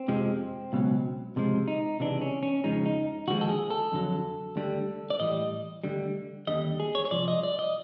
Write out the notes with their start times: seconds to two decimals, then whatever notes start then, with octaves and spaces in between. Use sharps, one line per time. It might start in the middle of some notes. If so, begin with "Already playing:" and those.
Already playing: C4
0.08 F2 C3 F3 G#3
0.73 C#2 B2 F#3
1.36 C#2 C3 F3 G#3
1.68 D#4
2.00 C#2 C3 E3 G#3 D4
2.22 C#4
2.43 C#4
2.64 F2 C#3 F3 G#3 D#4
2.86 D#4
3.28 D#2 D3 F3 G#3 F#4
3.41 A4
3.49 G#4
3.70 A4
3.92 F2 D3 F#3
4.56 D2 D3 G3
5.10 D5
5.20 A2 E3 G3 D#5
5.84 D2 D3 G3
6.47 D#2 D3 G3 D#5
6.80 G#4
6.95 C#5
7.05 C#5
7.11 C2 A#2 F3 D5
7.28 D#5
7.43 D5
7.59 D#5